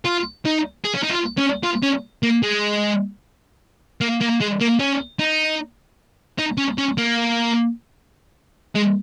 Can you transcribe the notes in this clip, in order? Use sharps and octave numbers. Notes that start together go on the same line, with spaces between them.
F4
D#4
G#4
C#4
D#4
F4
C#4
F4
C#4
A#3
G#3
A#3
A#3
G#3
A#3
C#4
D#4
D#4
C#4
C#4
A#3
G#3